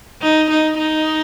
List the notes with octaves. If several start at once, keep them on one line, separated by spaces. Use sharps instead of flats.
D#4
D#4
D#4